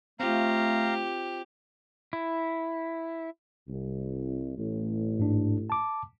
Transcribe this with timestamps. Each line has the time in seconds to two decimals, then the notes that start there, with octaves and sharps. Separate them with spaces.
0.20 A3 C4 F4 G4 F5 A#5
2.13 E4
3.68 C2
4.57 A1 A2
5.19 G#2 D4
5.70 A5 D6